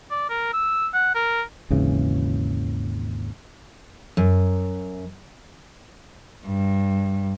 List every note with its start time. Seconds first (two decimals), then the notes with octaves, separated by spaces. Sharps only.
0.10 D5
0.30 A#4
0.54 E6
0.94 F#5
1.15 A#4
1.70 G#1 D#2 C#3 E3
4.17 F#2
6.46 G2